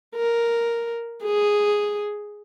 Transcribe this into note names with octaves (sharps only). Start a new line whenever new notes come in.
A#4
G#4